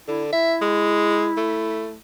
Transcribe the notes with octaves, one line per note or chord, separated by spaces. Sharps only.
D3 E4
E4 E5
G#3
A3